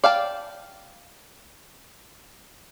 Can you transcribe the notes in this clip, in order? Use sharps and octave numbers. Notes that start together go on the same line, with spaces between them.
D5 F5 G5 A5